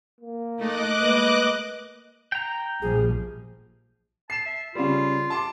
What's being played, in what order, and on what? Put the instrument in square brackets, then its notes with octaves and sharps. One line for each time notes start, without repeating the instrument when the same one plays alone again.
[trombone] A#3
[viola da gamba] A3 D#4 [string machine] D#5 D6 F#6
[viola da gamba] G#3 A#3 [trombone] B4
[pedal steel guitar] G5 A#5
[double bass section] A#1 F3 G3 [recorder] G#4
[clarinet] A5 [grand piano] C7 E7
[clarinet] E5
[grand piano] C#3 G3 [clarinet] F4
[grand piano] A5 C6 D6